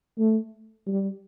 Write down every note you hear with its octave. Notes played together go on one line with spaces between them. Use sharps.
A3
G3